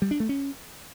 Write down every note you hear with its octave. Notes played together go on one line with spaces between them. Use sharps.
G3
D4
A3
C#4